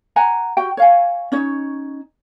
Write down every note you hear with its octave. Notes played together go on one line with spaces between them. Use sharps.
F#5 G#5 A#5
F#4 G4 G5
C#5 F5 G#5
C#4 D#4 C#5